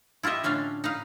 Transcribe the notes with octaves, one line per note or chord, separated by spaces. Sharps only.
E4 F4 G4 D#5 E5
A2 D3 C#4 D4 F5
D#4 B4 F5